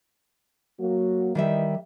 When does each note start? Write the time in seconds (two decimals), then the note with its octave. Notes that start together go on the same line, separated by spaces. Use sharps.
0.80 F#3 A#3 F#4
1.35 D#3 E3 G3 D#5 E5